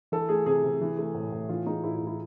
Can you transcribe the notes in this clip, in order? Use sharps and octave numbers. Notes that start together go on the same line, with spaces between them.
E3 A4
A3 G#4
C3 G#4
C3
E3
A3
A2
A2
E3 F4
G#3 D#4
A2 E4
E4
A2
E4